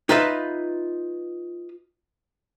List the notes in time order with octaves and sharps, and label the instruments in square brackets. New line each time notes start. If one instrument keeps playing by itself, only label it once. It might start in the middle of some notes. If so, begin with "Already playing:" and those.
[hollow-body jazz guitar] D#4 F4 B4 D#5 E5